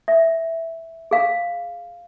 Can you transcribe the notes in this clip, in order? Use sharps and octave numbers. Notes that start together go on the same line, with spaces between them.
E5
G#4 F5